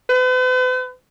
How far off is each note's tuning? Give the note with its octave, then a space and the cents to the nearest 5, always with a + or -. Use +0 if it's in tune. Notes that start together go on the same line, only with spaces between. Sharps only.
B4 +45